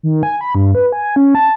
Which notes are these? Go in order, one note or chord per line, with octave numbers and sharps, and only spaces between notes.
D#3
G#5
B5
G2
B4
G#5
C#4
A5